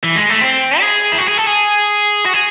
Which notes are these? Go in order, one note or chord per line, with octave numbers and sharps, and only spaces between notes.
E3
G#3
A3
C4
G#4
E4
F#4
G#4
A4
G#4
F#4
G#4